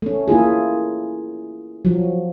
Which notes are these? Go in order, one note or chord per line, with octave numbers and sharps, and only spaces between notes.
A3 C#4
A#3 E4 F4 G#4
F3 F#3